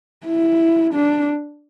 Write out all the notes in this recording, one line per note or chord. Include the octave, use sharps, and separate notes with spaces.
E4
D4